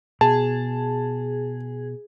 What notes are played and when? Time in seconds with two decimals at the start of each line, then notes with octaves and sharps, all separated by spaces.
0.21 B2 G#4 A5